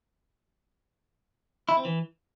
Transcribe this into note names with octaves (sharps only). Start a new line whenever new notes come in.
E4
C4
E3